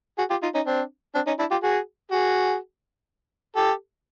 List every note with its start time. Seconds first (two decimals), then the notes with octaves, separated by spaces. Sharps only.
0.18 F#4 G#4
0.30 F4 G4
0.42 D#4 F4
0.55 C#4 D#4
0.66 C4 D4
1.15 C4 D4
1.27 C#4 D#4
1.39 D4 E4
1.51 F4 G4
1.63 F#4 G#4
2.12 F#4 G#4
3.56 G4 A4